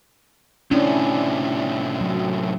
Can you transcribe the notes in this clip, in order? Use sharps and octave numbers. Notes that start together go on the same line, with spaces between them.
A2 C3 C#4 D4 E4
F#3